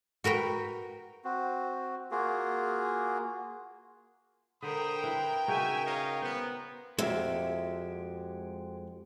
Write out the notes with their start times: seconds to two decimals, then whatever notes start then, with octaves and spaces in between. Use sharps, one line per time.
0.24 F#4 A#4 B4 G5
1.24 C4 F#4
2.11 A#3 F4 F#4 G#4
4.62 D3 A#4 C5 G5 B5 D#6
5.04 E4 B4
5.48 C#3 D#4 F#4 E5 G#5
5.85 C#5 D#5 F5
6.22 B3 C5
6.99 F2 A#2 G#3 F#4 G4 C5 E5